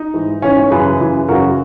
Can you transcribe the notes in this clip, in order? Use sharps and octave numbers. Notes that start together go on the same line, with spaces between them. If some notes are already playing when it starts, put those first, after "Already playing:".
Already playing: D#4
G#2 E3
G#2 E3 C#4
C#4
F#2 C#3 E3 G#4 B4
F#2 C#3 E3
F#2 C#3 E3 F#4 A#4